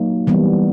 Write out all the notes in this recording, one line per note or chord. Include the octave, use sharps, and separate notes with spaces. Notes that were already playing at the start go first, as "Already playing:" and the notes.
Already playing: F#3 A#3 D#4
E3 G3 B3